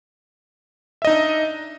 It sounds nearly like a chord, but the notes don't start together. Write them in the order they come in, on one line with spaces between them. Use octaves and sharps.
E5 D#5 D#4 D4